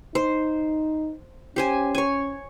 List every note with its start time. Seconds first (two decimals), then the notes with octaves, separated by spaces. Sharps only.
0.15 D#4 C5
1.56 C#4 G4 C5 G#5
1.95 C#5 G#5